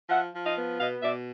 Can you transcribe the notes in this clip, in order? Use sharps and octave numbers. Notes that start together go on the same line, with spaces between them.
F3 E5 F#5
F3
D#5 F5
B3
B2 D#5 F5
B2 D5 E5